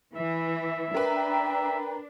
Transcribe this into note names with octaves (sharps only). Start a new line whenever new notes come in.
E3 E5
D4 A#4 B4 G5 A#5